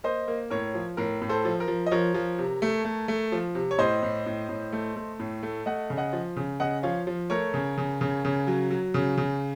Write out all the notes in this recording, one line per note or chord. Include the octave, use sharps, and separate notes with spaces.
A#3 C5 D#5
A#3
A2 A#4 C#5
F3
A2 A#4
A2
A4 C5
F3
A#4
F3
D#5
F3 A#4 C#5
F3
C3
A3
A3
A3
F3
C3
C#5
A2 C5 D#5
A2
A2
A2
A3
A3
A2
A3
A3 D#5 F#5
C#3
D#5 F#5
F3
C#3
C#3 D#5 F#5
F3 C#5 F5
F3
A3 A#4 C#5
C#3
C#3
C#3
C#3
F#3
F#3
C#3
C#3